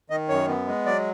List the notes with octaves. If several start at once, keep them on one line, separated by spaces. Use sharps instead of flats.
D#3 D#5
F#2 C#5
B3
G#3
F#3 D5